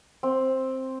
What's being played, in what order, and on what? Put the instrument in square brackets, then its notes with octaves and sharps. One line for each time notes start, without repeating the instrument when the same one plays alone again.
[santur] C4